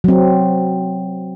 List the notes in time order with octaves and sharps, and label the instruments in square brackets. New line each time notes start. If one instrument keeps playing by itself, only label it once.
[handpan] F#3 C4